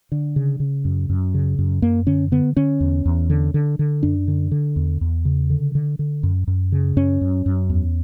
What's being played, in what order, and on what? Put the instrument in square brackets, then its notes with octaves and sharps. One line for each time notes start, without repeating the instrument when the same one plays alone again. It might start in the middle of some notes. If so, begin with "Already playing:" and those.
[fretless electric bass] D3
C#3
C#3
F#2
F#2
C#3
F#2
F#2 A#3
D3 C#4
D3 B3
D3 C#4
E2
E2
D3
D3
D3
F#2 D4
D3
D3
E2
E2
C#3
D3
D3
D3
F#2
F#2
C#3
F#2 C#4
F#2
F#2
E2